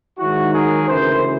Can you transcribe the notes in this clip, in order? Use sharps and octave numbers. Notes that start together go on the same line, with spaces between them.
G#2 D#3 F#3 E4 F#4
G#4 A#4
D2 C#3 E3 A#4 C5